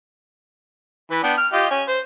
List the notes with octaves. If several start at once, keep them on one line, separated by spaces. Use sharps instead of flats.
E3 B4
B3 D4 G5
F6
F4 G4 D#5
C#4 G#5
C5